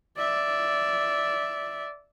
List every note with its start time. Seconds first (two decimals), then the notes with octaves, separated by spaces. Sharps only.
0.17 D5 E5